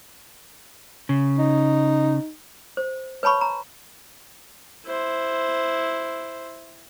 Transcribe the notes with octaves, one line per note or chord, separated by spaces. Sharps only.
C#3
D#4
C5
B4 C#5 A5 B5 C#6
A#5
E4 C5